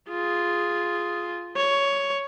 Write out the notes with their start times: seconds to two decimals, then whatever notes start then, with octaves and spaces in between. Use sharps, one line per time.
0.10 F4 G#4
1.56 C#5